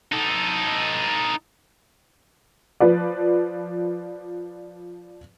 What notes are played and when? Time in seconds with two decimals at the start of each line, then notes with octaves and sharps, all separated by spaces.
0.12 D#4 A4
2.80 F3 B4 D5